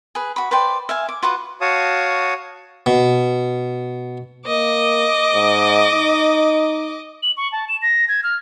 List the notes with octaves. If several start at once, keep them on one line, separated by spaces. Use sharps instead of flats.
G#4 B4
F#4 B5
B4 C5 D5 G5
E5 F5 G#5
D6
F4 F#4 B4 F#5
F#4 C#5 F5 A5 D#6
B2
A#3 D#5 D6
G#2
D#4
F#7
C#6
A5
E7
A#6
G#6
F6